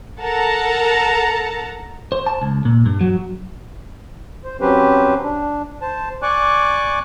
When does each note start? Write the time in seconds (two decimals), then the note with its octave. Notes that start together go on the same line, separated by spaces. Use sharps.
0.21 A4 A#4 F#5 A5 A#5
2.12 C5
2.26 A5
2.42 C#2
2.65 A#2
2.86 G2
3.01 F#3
4.44 C5
4.61 F#3 C4 C#4 G4 B4 C5
5.24 D4
5.82 C5 A5
6.22 D5 G#5 C#6 D6 F#6